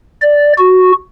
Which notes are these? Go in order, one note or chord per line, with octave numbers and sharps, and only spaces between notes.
D5
F#4